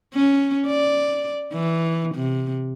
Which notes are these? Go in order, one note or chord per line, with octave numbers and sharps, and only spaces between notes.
C#4
D5
E3
C3